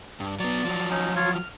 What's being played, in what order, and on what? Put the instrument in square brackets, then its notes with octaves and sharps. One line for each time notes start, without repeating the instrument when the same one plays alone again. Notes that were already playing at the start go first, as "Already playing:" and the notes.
[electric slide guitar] G2
[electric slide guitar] F#3 B3 [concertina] D5
[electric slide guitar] F3 F#3
[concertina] C#4 D#4
F4 C#5
F6